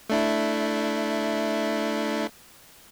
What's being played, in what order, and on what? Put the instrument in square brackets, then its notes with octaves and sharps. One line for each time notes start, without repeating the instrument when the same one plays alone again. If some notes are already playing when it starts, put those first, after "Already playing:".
[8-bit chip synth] A3 D4 E4